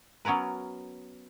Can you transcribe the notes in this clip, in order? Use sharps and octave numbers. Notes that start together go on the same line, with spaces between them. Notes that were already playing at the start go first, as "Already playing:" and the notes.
F#3 B3 C#4 A#4 B4